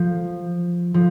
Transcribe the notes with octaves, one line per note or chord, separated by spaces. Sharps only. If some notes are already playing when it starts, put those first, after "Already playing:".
Already playing: F3
F3